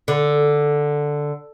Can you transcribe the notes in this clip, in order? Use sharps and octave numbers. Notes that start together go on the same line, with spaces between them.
D3